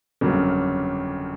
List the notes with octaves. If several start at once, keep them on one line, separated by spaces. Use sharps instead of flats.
G1 F2 C#3 F#3 A#3